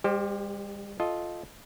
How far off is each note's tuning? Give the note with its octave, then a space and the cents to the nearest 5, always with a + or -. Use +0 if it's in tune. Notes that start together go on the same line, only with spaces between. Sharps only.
G3 +45 G4 +0 C5 +0
F4 +0 A4 -10 D#5 +0